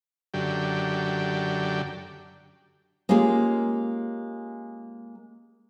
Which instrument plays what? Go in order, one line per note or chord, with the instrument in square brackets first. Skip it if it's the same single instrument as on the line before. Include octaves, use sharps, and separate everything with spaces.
[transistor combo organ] F#2 D3 G4
[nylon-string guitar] G#3 A#3 C#4 F4 G4 G#4